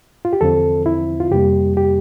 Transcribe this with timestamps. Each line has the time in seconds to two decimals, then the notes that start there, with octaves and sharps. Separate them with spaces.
0.25 F4
0.33 G4
0.41 E2 D3 F3 C4 A4
0.86 E4
1.20 F4
1.31 F2 C3 G3 A#3 G4
1.77 G4